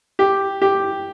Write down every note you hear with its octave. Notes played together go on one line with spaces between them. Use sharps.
G4
G4